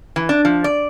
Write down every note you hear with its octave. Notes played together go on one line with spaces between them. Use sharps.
E3
D4
F3
D5